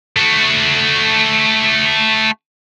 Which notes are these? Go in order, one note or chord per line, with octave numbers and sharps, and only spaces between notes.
A3 F#4